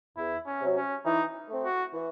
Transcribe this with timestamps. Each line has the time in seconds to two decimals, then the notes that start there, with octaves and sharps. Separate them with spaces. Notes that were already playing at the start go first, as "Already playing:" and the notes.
0.17 E2 E4
0.46 C#4
0.61 C3 F#3
0.76 C#4
1.05 E3 D#4
1.49 A3 C4
1.64 F#4
1.93 E3